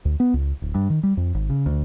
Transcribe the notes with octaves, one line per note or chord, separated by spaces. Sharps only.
D2
B3
C#2
D1
G2
D#3
G3
F2
G#1
C#3
D2